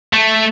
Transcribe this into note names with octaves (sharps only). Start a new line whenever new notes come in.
A3